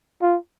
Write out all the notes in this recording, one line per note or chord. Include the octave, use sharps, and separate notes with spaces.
F4